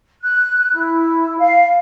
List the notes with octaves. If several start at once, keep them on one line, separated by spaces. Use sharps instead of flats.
F#6
E4
F5